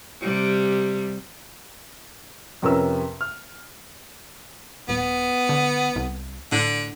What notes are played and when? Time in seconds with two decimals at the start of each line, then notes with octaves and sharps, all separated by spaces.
0.21 C3 G3
2.62 F2 C3 C#4 A#4 B4 E6
3.21 F6
4.89 D#1 B3
5.49 D3
5.96 C2
6.52 A2 D3